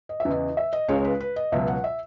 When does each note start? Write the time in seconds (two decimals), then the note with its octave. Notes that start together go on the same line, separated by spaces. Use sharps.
0.09 D#5
0.20 E5
0.25 E2 C#3 E3
0.31 D#5
0.57 E5
0.73 D#5
0.88 C#2 C#3 G#3 C#5
0.99 C#5
1.05 B4
1.20 B4
1.36 D#5
1.52 C#2 B2 F#3 E5
1.68 F#5
1.84 E5